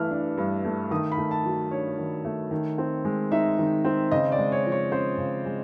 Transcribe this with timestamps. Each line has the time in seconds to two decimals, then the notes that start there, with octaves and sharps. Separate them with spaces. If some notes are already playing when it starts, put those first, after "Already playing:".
Already playing: G2 E3 A3 F6
0.11 D4
0.38 G2
0.65 A3
0.91 D#3 D#6
1.12 B5
1.18 A3
1.31 A5
1.45 F#3
1.71 D4 C#5
1.98 D#3
2.25 A3
2.51 D#3
2.78 C4
3.05 G#3
3.32 D#4 E5
3.59 D#3
3.85 C4
4.11 C#3 D#5
4.32 D5
4.38 G#3
4.52 C#5
4.65 F3
4.72 C#5
4.92 C#4 C5
5.18 C#3
5.46 G#3